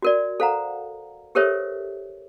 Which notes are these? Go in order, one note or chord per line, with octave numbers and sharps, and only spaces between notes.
F#4 A#4 D5
A4 C5 F5 F#5 A#5
G4 A4 A#4 C5 C#5 E5